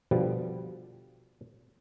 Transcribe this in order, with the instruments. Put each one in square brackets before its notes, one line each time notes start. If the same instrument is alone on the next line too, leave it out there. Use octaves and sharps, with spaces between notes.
[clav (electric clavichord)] B2 D3 F3 G3